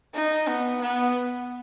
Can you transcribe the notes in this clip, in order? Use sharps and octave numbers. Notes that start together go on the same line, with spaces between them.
D#4
B3
B3